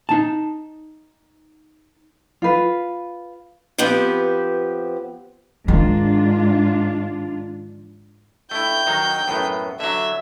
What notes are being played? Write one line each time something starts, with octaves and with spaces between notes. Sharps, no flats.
D#4 A5
F4 B4
F3 B3 C4 G4 B4
G#2 D#3 D4 F4
A3 E4 G5 G6
D#3 F#3 D#4
F#2 A2 B3
D3 F#3 E5